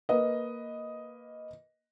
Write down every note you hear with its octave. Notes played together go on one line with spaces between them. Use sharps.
A#3 B4 D#5